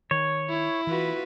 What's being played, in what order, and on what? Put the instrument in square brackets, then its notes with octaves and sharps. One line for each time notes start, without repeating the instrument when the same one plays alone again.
[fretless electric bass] D#3 [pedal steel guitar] C#5
[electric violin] E4
[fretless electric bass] E3 [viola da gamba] F4 F#4 B4